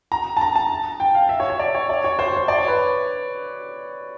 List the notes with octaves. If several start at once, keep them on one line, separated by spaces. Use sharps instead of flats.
A#5
A5
A#5
A5
G5
F5
E5
C#5
C#5
D5
C#5
D5
C#5
C5
C#5
C5
D5
C#5
B4